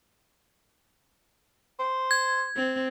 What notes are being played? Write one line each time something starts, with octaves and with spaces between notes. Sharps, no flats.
C5
G#6
C4